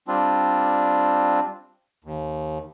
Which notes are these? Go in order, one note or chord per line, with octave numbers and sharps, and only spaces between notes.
G3 C4 D4 F4
D#2